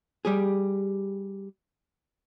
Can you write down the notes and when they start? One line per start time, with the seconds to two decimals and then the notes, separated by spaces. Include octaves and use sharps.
0.25 G3 G4 G#4